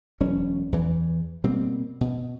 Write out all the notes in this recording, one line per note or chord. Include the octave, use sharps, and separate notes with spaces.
E1 F#3 C#4
E2 E3
B2 G3 A#3 C4
B2